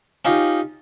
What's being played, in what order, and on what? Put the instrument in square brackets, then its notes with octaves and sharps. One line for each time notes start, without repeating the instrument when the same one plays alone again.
[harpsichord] C#4 D#4 F4 G4